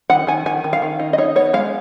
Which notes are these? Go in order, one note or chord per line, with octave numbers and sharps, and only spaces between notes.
D#3 F#5
D#3 G#5
D#3 G#5
D#3
F5
D#3
D#4
D#5
D#4 C#5
B3 C#5
G#3 F5